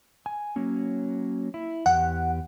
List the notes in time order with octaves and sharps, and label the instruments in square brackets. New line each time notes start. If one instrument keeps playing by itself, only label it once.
[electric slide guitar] G#5
F#3 A#3 C#4
E4
[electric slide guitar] E2 G4 [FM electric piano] F#5